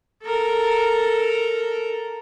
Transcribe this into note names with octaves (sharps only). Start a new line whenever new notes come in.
A4 A#4